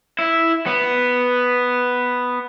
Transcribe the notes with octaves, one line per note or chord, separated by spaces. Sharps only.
E4
B3